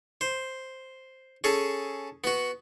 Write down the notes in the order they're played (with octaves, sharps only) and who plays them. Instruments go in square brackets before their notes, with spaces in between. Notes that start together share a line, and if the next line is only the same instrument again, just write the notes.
[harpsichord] C5
C#4 G#4 A4
B3 F#4